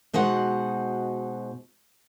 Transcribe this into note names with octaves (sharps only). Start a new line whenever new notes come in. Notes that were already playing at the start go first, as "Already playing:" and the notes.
B2 G#3 D#4 F#4 C5 F#5